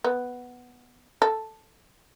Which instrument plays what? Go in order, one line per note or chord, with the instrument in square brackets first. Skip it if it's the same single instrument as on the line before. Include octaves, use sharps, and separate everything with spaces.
[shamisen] B3
A4